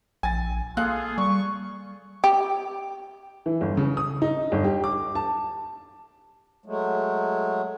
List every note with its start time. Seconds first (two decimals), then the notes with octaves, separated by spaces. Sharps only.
0.23 A#1 G#5 A6
0.77 A#3 F4 G#4 A4 F5 F#6
1.18 G3 C#6
2.24 G4
3.46 E3
3.61 G1
3.77 C#3
3.97 D#6
4.22 D#4
4.52 G1
4.64 G4
4.84 D6
5.15 A5
6.66 F#3 G#3 A3